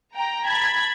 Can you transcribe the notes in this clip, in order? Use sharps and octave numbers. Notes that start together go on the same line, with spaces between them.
G5 A#5
A5 B5 G#6